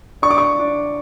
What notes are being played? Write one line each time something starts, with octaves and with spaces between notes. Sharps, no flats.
D4 C#6
D6
C#6
D4